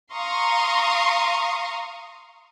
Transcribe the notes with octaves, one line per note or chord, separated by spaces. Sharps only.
F5 A#5 C6 C#6 D#6